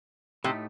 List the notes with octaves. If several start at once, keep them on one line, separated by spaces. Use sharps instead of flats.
A2 C3 A3 D#4 G4